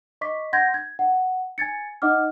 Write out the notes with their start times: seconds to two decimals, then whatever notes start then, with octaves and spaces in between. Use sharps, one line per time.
0.21 D#5 C#6 D6 B6
0.53 F#5 C6 G6 G#6 A#6
0.74 G#6
0.99 F#5
1.58 G#5 G#6 A6 C#7
2.02 D#4 D#5 F#5 D6 F6